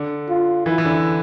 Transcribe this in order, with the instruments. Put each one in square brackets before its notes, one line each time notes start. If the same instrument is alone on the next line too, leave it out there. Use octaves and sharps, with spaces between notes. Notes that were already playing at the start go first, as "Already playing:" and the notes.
Already playing: [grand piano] D3
[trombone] F4
[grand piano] E3 [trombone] E4
[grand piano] E3
D3